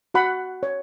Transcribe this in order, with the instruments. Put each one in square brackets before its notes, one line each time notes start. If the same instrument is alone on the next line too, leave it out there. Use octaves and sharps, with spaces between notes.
[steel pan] F#4 F#5 B5
C#5